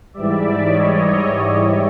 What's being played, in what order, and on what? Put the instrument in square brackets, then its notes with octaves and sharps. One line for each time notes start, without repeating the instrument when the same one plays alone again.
[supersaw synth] G#2 E3 G3 D5 E5
C#5 D#5